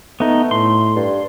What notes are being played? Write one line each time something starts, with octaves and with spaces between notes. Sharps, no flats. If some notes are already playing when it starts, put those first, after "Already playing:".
A3 B3 D#4
A2 C6
G2